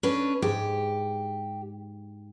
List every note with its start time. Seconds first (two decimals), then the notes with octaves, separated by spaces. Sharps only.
0.03 C#4 D4 B4
0.42 G#2 G4